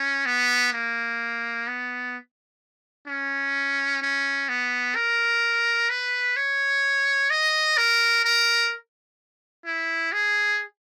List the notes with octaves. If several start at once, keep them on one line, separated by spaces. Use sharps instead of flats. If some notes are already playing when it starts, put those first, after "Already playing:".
Already playing: C#4
B3
A#3
B3
C#4
C#4
B3
A#4
B4
C#5
D#5
A#4
A#4
E4
G#4